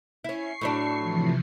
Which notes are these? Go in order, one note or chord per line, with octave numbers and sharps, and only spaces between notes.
C#4 E4 C#6 C7
A2 F#3 D4
C3 E3 F3